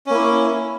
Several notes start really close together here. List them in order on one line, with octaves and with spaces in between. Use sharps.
C#4 A#3 E4